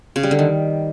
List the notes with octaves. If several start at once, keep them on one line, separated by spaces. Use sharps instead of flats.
C#3
G3
D3
D#3